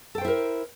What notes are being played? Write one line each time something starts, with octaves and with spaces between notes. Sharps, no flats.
E4 A4 A#4 C5 G5